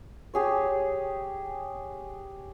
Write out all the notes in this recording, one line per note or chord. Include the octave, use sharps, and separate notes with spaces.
G4 G#4 C#5